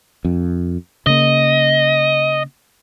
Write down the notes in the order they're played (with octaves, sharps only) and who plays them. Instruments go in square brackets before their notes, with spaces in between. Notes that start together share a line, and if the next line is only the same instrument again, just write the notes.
[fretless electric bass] F2
[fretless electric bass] C#3 A#3 [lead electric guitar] D#5